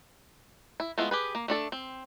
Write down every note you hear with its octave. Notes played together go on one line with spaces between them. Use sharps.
E4
G#3 A3 B3 E4 F4
G4 G#4 B4
A#3
A3 D4 A4
C4